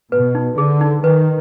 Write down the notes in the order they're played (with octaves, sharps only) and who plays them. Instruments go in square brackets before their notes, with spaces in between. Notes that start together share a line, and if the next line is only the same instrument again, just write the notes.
[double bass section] B2 [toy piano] B4
[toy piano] D#4
[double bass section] D3 [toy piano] G#4
[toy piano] D#4
[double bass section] D#3 [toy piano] B4